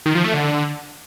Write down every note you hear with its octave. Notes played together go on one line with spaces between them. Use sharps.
D#3
F3
A3
D3